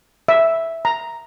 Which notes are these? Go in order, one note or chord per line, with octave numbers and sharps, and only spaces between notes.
E5
A#5